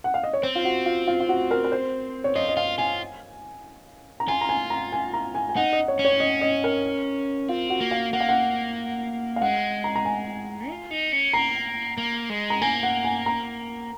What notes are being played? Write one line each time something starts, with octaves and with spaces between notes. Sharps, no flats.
F#5
F5
D#5
C#5
C4 C5
F4
F#4
F4
F4
F4
F#4
A#4
A#4
C5
C#5
F4 D#5
D#5
F4 F5
F4 G#5
A#5
F4 G#5
A#5
G#5
A#5
G#5
A#5
G#5
G#5
D#4 F#5
D#5
C#5
C#4
C#5
D#5
D#5
A#4
C4 F4
F#4
A#3
F5
A#3 F#5
F5
F#5
F5
G#3 F#5
A#5
A#5
G#5
F4
D#4
C#4
A#3 A#5
A#3
G#3
A#5
A#3 G#5
F#5
G#5
A#5